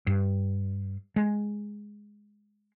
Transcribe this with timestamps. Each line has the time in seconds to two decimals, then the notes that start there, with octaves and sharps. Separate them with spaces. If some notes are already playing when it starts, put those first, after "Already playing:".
0.07 G2
1.16 G#3